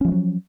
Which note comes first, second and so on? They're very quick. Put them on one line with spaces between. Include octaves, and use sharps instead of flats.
C#4 F3 G#3 F#3